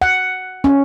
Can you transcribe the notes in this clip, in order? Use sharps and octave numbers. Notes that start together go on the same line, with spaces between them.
F#5
C#4